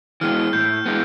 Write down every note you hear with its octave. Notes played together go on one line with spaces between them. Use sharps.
E3 G#3 B3 F6
A2 G6
E3 G#3 B3